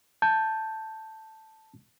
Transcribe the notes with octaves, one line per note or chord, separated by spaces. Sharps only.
A5 G6